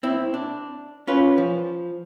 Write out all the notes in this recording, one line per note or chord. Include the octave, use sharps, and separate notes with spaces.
C4 E4
D4
C#4 F4 B4
F3